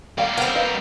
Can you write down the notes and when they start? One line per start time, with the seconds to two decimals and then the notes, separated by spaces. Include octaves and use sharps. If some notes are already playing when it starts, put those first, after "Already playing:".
0.18 G3 A#3 D5 F5 G5
0.37 C4 A#4 F#5
0.55 B4 D#5 F5